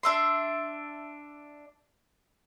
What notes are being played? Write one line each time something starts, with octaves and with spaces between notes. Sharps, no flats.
D4 E5 C6